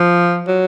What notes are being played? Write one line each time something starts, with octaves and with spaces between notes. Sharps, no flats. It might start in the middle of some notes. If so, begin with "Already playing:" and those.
Already playing: F3
F#3